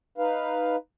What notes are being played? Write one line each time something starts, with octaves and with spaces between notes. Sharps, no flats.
D#4 B4 F5